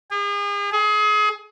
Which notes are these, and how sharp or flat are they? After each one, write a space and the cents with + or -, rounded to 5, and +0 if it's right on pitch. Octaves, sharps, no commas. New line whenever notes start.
G#4 -40
G#4 +30